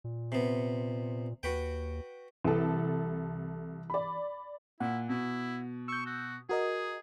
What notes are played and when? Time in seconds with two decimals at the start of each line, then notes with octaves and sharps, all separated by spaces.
0.04 A#2
0.32 C3 B3
1.43 D#2 F#4 B4 G5
2.44 C2 E3 A4
3.90 D5 B5
4.80 A#2 E4 F#5
5.09 B2 E4
5.88 C#6 E6 G6
6.06 F#4
6.49 F#4 G#4 A#4 D#5